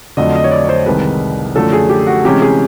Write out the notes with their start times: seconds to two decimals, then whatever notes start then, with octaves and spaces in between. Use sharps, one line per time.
0.17 F2 D3 F#3 A3 D#5
0.35 D#5
0.44 C#5
0.51 D5
0.65 C#5
0.69 C5
0.86 C2 C3 D#3 G#3 B4
1.55 F#2 D3 F3 A3 A4
1.73 G#4
1.89 G4
2.07 F#4
2.24 C3 E3 G#3 C#4 G4
2.42 G#4